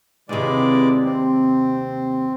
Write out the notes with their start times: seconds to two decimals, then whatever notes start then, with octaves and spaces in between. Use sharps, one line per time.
0.29 D#2 C3 E3 G#3 D5
1.05 C4